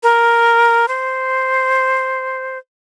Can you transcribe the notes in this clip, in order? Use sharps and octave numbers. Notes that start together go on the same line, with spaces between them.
A#4
C5